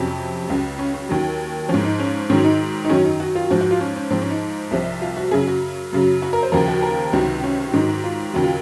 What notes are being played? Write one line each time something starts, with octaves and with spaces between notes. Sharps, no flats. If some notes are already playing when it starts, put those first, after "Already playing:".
Already playing: F2 C3 F#3 C#4
C#2 C#3 F#3
C#4
C#4
D#2 D#3 F#3
G#2 F3 C#4
D#4
C#4
G#2 D#3 F#3 C#4
D#4
D#4
F#2 D#3 F#3 C#4
D#4
F#4
F4
G#2 F3 F#4
F#4
F4
C#4
C#4
G#2 F3 C4
C#4
D#4
C2 C3 F3
F4
F#4
F#2 C#3 F#3 G#4
F#4
F#2 C#3 F#3
F#4
A#4
C5
D#2 C#3 F3 A#4
F#4
A#4
C#2 C3 D#3 F#3
C#4
G#2 D#3 F#3 D#4
F#4
F4
D#2 C#3 F#3 F#4
F4